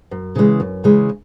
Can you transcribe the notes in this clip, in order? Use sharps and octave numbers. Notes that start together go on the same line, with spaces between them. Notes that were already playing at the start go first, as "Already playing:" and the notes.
F#2
C#3 E3 G#3
F#2
C#3 E3 G#3